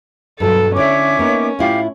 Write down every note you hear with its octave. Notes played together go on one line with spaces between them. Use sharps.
G2 B2 F#3 A4
D3 C#4 E4 C#5 D5 E5 D6
A#3 B3 D#4
A2 E4 F4 G4 F5